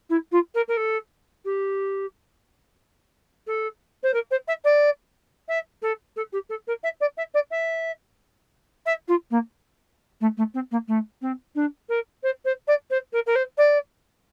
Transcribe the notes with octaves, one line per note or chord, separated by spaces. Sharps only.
E4
F4
A#4
A#4
A4
G4
A4
C5
A#4
C5
E5
D5
E5
A4
A4
G4
A4
A#4
E5
D5
E5
D5
E5
E5
F4
A#3
A3
A3
C4
A#3
A3
C4
D4
A#4
C5
C5
D5
C5
A#4
A#4
C5
D5